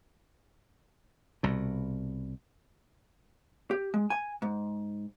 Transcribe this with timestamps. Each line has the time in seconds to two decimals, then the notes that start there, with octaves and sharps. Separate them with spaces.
1.43 C2 B2
3.71 G4
3.94 G#3
4.10 G#5
4.42 G#2